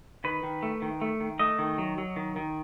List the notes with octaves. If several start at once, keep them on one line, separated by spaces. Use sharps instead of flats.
D#3 B4
D#3
A3
D#3
A3
D#3
A3 D#5
D#3
F#3
F#3
D#3
D#3